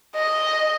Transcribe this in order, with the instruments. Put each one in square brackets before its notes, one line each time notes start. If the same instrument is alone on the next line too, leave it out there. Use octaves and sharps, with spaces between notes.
[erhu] D#5